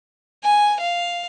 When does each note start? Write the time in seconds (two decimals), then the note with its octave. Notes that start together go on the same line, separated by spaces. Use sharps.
0.44 G#5
0.80 F5